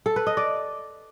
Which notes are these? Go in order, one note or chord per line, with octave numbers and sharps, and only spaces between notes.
A4
B4
D#5
D5